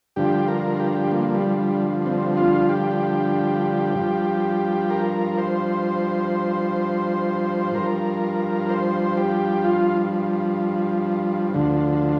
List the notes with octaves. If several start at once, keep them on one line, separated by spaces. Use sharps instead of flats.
G2 D3 F3 G4
A#4
G4
A#4
G4
A#3
G3
G3
C4
F4
G4
G2 F3
A#4
C5
G2 F3 A#4
C5
G4
F4
D2 D3 F3